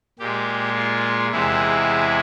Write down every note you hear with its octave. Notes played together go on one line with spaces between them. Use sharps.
A#2 G#3 G4
F4
E2 C3 E3 G#3 E4